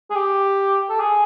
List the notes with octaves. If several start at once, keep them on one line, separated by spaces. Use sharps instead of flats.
G#4
G4
A4
G#4